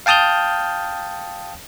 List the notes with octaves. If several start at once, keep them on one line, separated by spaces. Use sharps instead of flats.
F5 G5 A5 D#6 F6 G6